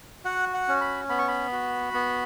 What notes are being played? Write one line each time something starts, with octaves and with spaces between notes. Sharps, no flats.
F#4 F#5
F#5
C#4
B5
B3 B5
C#6
B5
F#4
B3